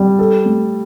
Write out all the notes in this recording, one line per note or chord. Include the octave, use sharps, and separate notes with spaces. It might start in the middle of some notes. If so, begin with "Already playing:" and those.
Already playing: G3
A4
A3